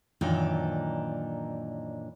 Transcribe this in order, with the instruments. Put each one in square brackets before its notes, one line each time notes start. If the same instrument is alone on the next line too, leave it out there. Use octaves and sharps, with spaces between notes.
[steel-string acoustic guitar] F#2 A#2 D#3 E3 D4 D#4